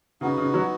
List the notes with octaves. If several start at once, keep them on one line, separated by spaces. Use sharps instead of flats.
C#3 B3 D#4 F#4
C#3
F#3